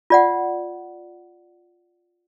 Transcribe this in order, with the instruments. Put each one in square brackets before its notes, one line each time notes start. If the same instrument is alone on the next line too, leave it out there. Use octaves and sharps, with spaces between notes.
[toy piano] F4 D5 F#5